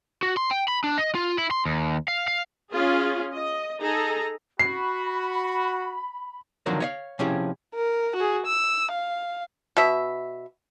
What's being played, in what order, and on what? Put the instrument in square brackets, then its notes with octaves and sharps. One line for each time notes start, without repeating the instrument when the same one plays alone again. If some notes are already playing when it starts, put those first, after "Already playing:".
[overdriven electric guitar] F#4
C6
G5
B5
D4
D#5
F4
E4
C6
D#2
F5
F5
[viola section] C#4 F4 G#4
D#5
D#4 G#4 A4 A#5
[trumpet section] F#4 [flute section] B5 [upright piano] C7
[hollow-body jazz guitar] D3 D#3 F3 F#3 A#3 C4
C#5 D#5 F5
C3 F3 C#4 E4 G#4
[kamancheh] A#4
F#4 G#4
E6
F5
[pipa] B2 E5